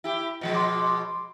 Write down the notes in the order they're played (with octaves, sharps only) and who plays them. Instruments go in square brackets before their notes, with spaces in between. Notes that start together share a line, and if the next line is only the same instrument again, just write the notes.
[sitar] E4 G4
B2 F3 G#3
[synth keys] C6 D6